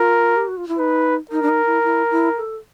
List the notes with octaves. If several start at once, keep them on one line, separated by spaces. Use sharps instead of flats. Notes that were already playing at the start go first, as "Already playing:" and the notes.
Already playing: F4 A#4
G4
F#4
F4
E4
D#4 B4
D#4 A#4
D4
D#4
E4
E4
E4
A4